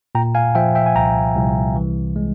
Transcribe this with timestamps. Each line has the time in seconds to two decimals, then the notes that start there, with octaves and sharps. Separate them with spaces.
0.15 A#2 G5 A#5
0.35 F5 G#5
0.55 F3 E5 G5
0.75 E5 G5
0.86 G#5
0.95 C2 G5 A#5
1.36 C2
1.76 E3
2.16 G#3